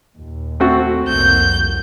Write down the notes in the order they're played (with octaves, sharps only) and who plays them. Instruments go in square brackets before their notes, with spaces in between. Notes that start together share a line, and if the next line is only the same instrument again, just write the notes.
[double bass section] D#2 A#2
[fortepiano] A3 C4 F#4
[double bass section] C2 F2 A#3 [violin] G6